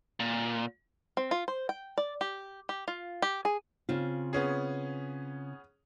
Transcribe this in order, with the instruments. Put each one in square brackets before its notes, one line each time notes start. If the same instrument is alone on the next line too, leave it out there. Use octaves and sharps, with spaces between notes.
[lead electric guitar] A#2
[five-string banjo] C4
F4
C5
G5
D5
G4
G4
F4
G4
G#4
[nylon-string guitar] C#3 C4 F4
[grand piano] B3 C#4 G#4